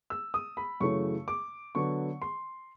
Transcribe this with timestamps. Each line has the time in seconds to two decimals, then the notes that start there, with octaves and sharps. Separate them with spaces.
0.10 E6
0.34 D#6
0.57 B5
0.80 F#2 C#3 E3 A3 C#4 C#6
1.28 D6
1.75 D3 F#3 B3 C#6
2.22 C6